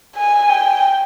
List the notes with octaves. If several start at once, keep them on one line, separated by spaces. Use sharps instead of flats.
G#5
G5